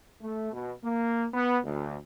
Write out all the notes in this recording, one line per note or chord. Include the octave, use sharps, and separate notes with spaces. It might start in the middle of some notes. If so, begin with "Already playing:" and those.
A3
B2
A#3
B3
D2